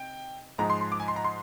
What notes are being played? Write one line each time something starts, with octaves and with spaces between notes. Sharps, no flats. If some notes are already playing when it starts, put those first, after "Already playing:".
Already playing: C3 D#4 G5
G#2 F3 G#3 D#4 A#5
C6
C6
D6
G#5
C6
A#5
C6